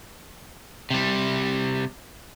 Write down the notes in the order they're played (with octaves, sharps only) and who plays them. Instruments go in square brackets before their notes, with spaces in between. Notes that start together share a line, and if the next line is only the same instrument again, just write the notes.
[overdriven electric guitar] C3 G3